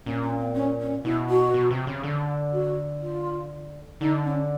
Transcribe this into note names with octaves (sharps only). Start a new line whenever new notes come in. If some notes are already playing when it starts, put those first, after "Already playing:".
A#2 C#4
C#4
C4
C#4
C#4
B2 E4
F#4
B2
C3
C#3
D3
F#4
F4
D3 D#4
C#4